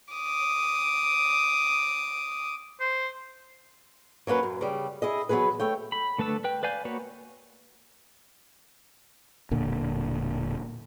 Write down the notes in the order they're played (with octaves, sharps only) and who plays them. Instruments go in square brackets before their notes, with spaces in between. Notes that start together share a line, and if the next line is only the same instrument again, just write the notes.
[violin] D6 D#6
[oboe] C5
[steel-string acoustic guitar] F#3 A#3 C#4 B4
F#2
C#3 G3
E4 G#4 D#5
E3 F#3 A#3 B3 G#4 B4
A3 C#5 G5
[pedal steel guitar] B5
D3 A3 B4 A5 E6
B4 G5
B4 D5 F5 G#5 G6
A#3 B3 F#4 B4 C#5
[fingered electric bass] E1 A#2 D3